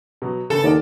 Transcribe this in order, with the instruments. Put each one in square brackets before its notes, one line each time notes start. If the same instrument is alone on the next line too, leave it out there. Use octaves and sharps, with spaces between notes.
[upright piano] B2 F#3
[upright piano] C#3 A#3 B3 [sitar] A4
[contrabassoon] D#2 [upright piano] A#4 D5 D#5